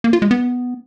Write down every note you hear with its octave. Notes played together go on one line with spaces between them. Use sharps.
A#3
F4
G#3
B3